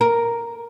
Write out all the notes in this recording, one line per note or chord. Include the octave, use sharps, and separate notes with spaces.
A#4